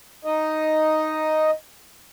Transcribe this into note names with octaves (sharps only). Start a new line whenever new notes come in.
D#4 D#5